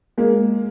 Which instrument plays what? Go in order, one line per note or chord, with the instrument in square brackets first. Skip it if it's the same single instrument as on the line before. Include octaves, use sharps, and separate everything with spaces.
[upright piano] G#3 A#3